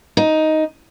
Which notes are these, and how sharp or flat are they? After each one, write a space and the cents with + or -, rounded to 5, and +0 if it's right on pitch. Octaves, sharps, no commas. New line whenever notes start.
D#4 +5